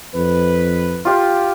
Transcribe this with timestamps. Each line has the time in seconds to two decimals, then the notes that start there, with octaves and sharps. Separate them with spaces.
0.14 F2 B4
1.05 F4 G4 F5